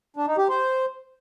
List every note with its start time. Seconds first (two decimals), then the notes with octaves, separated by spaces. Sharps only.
0.16 D4
0.27 D#4
0.38 G4
0.49 C5